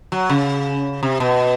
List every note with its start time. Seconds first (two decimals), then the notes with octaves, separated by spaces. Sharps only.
0.12 F#3
0.30 C#3
1.03 C3
1.20 B2